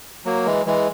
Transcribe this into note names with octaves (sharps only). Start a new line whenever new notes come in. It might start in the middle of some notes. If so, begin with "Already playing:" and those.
F#3 A#3
E3 G#3
E3 G#3